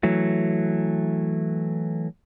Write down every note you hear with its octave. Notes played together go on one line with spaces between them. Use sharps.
E3 F#3 A3